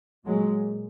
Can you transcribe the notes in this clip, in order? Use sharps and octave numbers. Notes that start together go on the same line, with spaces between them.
A#2 F#3 G#3